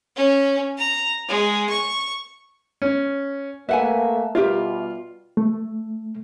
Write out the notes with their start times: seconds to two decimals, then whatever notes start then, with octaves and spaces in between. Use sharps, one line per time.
0.16 C#4
0.78 A#5
1.29 G#3
1.69 C#6
2.82 C#4
3.69 A3 A#3 B4 E5 F#5 G#5
4.35 B2 G3 F4 G4 A#4 E5
5.37 A3